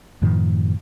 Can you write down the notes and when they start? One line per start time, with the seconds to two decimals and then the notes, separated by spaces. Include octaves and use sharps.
0.22 F#2 A2 D#3 F3